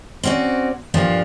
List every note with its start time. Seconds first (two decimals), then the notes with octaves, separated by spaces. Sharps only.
0.23 C4 C#4 F#4 C5 D5
0.94 G2 A#2 F3 D4 F4